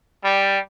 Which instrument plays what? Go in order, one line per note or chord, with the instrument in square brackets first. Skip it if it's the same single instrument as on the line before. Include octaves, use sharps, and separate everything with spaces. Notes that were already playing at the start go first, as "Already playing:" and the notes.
[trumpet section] G3